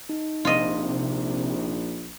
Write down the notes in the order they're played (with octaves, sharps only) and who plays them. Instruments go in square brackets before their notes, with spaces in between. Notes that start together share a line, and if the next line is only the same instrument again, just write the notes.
[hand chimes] D#4
[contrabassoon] A#1 [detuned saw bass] C3 [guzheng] F4 D#5